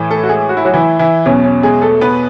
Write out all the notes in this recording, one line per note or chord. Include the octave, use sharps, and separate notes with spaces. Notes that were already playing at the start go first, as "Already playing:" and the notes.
Already playing: A2 E3
A3 A4
F#4
G#3 G#4
F#4
E4
F#3 F#4
E3 E4
E3 E4
E2 B2 F#3 C#4
C#4
G#3 G#4
A3 A4
B3 B4